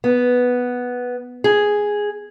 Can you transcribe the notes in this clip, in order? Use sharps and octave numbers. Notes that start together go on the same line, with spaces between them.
B3
G#4